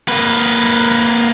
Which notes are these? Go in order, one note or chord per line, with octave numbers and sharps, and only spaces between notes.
A#3 B4